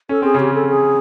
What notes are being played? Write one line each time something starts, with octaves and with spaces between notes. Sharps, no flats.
C#4 A4
C4 G#4
C#3 C#4
G4
A4
G#4